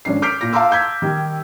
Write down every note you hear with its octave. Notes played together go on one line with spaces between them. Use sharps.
G#1 C#4 D4 C7
D6 F6 G6 B6 C7 D7
A#2 A#6
F5 A5 A#5 C6 D6 E6
E6 G6 G#6 B6
D#3 G3